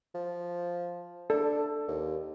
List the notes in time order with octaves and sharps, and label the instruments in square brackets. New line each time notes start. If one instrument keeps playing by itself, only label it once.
[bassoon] F3
[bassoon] D4 [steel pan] A4
[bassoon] D#2